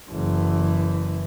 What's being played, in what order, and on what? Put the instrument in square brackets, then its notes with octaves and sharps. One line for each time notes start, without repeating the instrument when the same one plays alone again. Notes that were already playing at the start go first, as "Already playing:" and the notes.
[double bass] F#1 E3